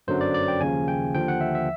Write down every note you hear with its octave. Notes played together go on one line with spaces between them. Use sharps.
G1 F#2 D3 F#3 C5
D5
D5
G5
D#2 C#3 F3 G#5
G5
D#2 D3 F3 G5
F#5
E5
E5